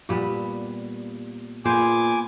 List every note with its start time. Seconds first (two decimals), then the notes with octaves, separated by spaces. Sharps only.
0.09 A#2 G3 B3
1.65 A#2 B3 G#4 C5 G#5 D6